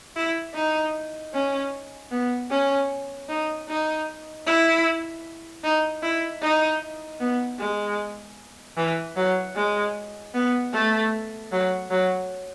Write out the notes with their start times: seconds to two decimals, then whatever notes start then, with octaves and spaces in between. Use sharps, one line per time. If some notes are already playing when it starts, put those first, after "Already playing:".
0.16 E4
0.55 D#4
1.34 C#4
2.12 B3
2.50 C#4
3.29 D#4
3.69 D#4
4.47 E4
5.64 D#4
6.03 E4
6.42 D#4
7.20 B3
7.59 G#3
8.77 E3
9.16 F#3
9.56 G#3
10.34 B3
10.73 A3
11.52 F#3
11.91 F#3